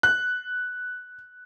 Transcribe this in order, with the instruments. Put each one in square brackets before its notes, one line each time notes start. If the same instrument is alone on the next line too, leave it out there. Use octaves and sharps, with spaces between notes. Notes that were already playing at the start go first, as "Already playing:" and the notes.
[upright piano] F#6